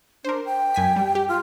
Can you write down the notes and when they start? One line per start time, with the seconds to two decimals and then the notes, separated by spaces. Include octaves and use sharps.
0.25 D4 A#4 C5
0.45 G5
0.74 F#2 G#5 B6
0.96 G3
1.15 G4
1.29 F4